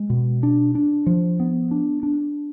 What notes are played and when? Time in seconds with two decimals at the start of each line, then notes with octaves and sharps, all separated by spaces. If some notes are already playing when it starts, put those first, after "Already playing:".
Already playing: G#3
0.10 B2
0.43 D4
0.75 D4
1.06 F3
1.40 B3
1.71 D4
2.03 D4